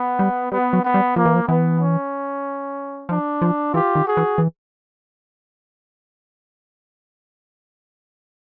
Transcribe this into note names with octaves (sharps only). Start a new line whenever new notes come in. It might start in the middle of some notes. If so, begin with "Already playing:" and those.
Already playing: B3
G3
G3 B3
F#3
B3
G3
F3 A#3
E3
F3
E3 B3
C#4
F3 D4
F3
E3 F4 G4
D#3
F#4 G#4
E3
E3